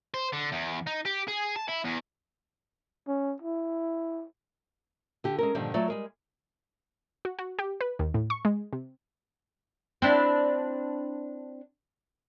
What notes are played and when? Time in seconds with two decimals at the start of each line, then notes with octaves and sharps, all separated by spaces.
0.14 C5
0.33 D3
0.52 E2
0.87 D#4
1.05 G4
1.28 G#4
1.56 A5
1.69 E4
1.85 E2
3.08 C#4
3.42 E4
5.24 D3 G4
5.38 G#3 C#4 A#4
5.55 G2 A#2 D3 D#3 F3 G3
5.74 F#3 A3 F4 C#5 D5
5.88 G3 G#3 A#4
7.25 F#4
7.39 F#4
7.59 G4
7.81 B4
7.99 D#2
8.14 A2
8.30 C#6
8.45 G#3
8.73 C3
10.02 C4 D4 E4